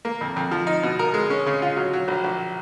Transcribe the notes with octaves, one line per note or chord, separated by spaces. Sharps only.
A#3
F2
F2
F3
D#4
B2
A#4
G#3
C#4
C#3
F4
F#3
F#3
A#1
A#1